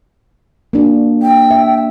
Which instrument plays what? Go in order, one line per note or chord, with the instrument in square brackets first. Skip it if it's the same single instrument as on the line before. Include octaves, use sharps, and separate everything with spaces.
[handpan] A#3 D4 F#4
[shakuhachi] G5
[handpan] E5